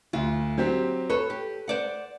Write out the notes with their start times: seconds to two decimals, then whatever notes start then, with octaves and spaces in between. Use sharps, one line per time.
0.13 D2 F4
0.58 F#3 C4 G4
1.10 A4 B4 C#5
1.30 G4
1.68 C5 D5 F#5